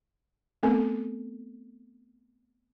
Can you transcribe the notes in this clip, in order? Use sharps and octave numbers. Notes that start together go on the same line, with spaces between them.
A3 B3 C4 A4 A#4